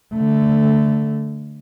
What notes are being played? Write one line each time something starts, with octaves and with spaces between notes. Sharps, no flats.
D3 A3